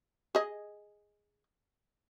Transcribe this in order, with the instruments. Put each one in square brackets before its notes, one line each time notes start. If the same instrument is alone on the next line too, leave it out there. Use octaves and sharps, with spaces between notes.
[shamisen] G#4 D#5